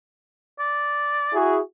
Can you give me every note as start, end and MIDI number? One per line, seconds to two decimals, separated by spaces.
0.60 1.38 74
1.33 1.59 64
1.33 1.59 66
1.33 1.59 68